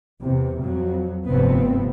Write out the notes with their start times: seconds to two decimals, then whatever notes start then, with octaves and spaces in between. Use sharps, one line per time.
0.23 E2 C3
0.60 F2 F#3
1.26 F1 G2 C3 F3 B3 C4